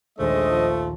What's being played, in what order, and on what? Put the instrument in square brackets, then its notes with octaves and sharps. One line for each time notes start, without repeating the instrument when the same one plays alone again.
[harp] A#1 D#2 [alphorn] G#3 [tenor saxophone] A3 [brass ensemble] D4 C5 D#5
[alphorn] F3